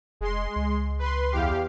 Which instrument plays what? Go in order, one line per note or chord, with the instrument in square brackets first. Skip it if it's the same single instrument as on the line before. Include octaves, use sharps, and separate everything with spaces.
[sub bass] F1 [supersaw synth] G#3 C6
[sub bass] C#2
[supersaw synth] B4 C6
E2 G4 F5